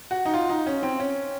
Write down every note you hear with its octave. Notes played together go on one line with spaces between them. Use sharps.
F#4
D#4
F4
D#4
C#4
C4
C#4